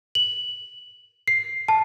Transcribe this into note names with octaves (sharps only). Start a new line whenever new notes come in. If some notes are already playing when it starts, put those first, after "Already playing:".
F#7
C7
A5